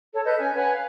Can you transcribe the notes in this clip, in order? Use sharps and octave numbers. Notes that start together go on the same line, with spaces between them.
A4 C#5
A4 B4 D#5 G6
C#4 G#5
B4 C#5 F#5 G#5
F5